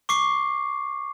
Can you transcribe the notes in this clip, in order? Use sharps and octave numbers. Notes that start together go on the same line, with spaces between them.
C#6 D6 C7